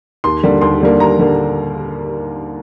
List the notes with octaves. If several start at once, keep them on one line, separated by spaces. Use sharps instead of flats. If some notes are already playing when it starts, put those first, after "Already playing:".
D#2 C6
D3 G3 A#3
D#2 C6
D3 G3 A#3
D#2 A#5
D3 G3 A#3